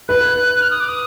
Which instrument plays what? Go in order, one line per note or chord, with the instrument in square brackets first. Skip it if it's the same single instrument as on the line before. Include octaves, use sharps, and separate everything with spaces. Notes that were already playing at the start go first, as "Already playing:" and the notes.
[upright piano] B4 [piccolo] F#6
[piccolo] F6
D#6
D6
D#6